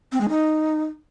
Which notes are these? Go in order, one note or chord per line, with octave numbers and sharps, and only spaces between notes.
C4
G#3
D#4